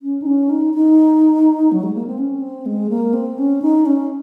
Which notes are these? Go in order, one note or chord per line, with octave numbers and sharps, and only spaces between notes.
C#4
D#4
C#4
D#4
D#4
F#3
G#3
A#3
C4
C#4
C4
G#3
A#3
C4
C#4
D#4
C#4